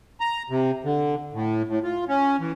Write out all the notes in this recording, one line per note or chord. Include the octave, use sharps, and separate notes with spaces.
A#5
C3
D3
A2
A2
F4
C#4
E3